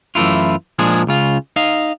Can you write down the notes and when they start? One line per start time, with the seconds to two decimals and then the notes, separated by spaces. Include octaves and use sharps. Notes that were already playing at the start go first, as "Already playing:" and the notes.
0.15 F#2 E3 A3 E4 F4
0.79 A#2 F3 G#3 D4 G#4
1.07 C#2 C#3 F4
1.56 D#4 D#5 F5